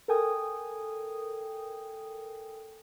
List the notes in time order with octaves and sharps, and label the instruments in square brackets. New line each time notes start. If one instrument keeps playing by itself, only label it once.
[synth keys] A4 A#4 G5 G#5 D#6